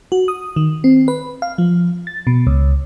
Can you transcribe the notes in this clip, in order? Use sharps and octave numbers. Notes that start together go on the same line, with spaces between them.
F#4
D#6
D#3
C4
B4
F5
F3
A6
B2
C#2